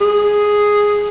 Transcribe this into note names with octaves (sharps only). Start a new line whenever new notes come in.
G#4